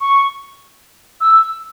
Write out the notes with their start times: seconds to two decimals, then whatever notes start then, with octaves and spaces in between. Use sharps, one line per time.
0.01 C#6
1.21 E6